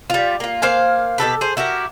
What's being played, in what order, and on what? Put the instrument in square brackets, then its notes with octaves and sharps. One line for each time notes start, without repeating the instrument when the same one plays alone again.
[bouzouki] G3 F4
A#3 F4
A#3 C5 F5 G#5
B2 G4 A4 B4
G#4 C5
E4 F#4 G4 A#4